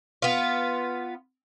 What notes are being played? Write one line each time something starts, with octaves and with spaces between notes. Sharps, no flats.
B3 F4